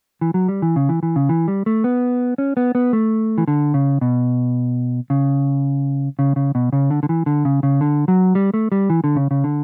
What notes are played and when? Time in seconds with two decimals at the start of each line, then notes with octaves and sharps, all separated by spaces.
0.21 E3
0.34 F#3
0.48 G3
0.62 E3
0.76 C#3
0.89 E3
1.03 E3
1.16 C#3
1.29 E3
1.48 G3
1.66 A3
1.84 B3
2.38 C#4
2.57 B3
2.75 B3
2.93 A3
3.38 E3
3.48 D3
3.74 C#3
4.01 B2
5.10 C#3
6.19 C#3
6.36 C#3
6.55 B2
6.73 C#3
6.90 D3
7.03 D3
7.09 E3
7.26 D3
7.45 C#3
7.63 C#3
7.81 D3
8.08 F#3
8.35 G3
8.54 A3
8.72 G3
8.90 E3
9.04 D3
9.16 C#3
9.31 C#3
9.44 D3